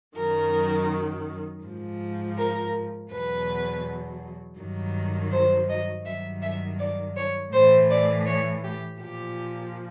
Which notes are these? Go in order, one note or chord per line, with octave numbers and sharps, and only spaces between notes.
F#2 D#3 F#3 A#4
G#2 F3
A#4
E2 B2 F#3 B4
G2 D#3 F#3
C5
D#5
G2 D#3 F#3 E5
E5
D5
C#5
A2 E3 C5
D5
C#5
G4
A#2 F3 G4